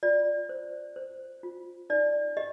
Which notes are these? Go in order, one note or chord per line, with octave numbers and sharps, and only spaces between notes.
F4 D5
C5
C5
F4
D#4 D5
G4 D#5